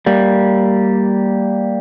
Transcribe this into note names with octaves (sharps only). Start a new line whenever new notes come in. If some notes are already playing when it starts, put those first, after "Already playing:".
G3 A#3